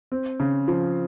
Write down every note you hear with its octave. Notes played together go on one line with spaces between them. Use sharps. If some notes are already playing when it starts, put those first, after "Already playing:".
C4
C#3
F3